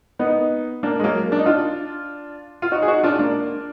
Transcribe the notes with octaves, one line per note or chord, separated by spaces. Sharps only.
B3 D#4
A#3 D4
G#3
F#3 A#3
D4
D#4
D4 F4
F4
D#4 F#4
G#4
D#4 F#4
D4 F4
A#3 D4